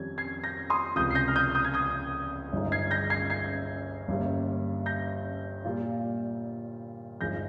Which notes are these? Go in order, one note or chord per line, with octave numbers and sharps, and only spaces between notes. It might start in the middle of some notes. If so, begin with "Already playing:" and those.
Already playing: F2 D#3 G3 C#4 F4 G#6
G#6 C7
G6 A#6
C6 D#6
C#2 C3 F3 D#6 G6
C7
G6 A#6
F6
D#6 G6
D#6 G6
G#6
D#6 G6
G1 G2 F3 G#3 D#4
G#6 C7
G6 A#6
G#6 C7
G#6 C7
G1 G2 G3 A#3 C#4
G6 A#6
A#2 G3 A#3 F4
G1 G2 F3 G#3 D#4 G6 A#6